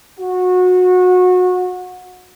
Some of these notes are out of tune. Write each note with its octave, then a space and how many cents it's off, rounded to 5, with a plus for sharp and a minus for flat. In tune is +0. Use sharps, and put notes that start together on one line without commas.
F#4 -25